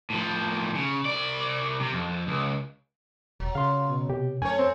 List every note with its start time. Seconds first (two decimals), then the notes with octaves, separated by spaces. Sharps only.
0.10 A2 F3
0.75 C#3
1.05 C2 D5
1.80 C3
1.93 F2
2.28 C#2
3.40 E1 F#3
3.55 C#3 F5 C6
3.88 B2
4.10 C3 G4
4.42 F#2 A3 C#5 G#5
4.59 C4